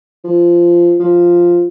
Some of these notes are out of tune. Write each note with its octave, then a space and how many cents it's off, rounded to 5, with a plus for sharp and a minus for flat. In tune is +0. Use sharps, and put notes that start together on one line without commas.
F3 -15
F3 +0